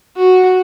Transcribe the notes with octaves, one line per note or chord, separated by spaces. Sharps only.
F#4